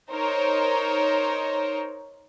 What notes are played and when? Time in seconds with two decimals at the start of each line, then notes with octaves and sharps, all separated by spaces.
0.11 D#4 A#4 C5 C#5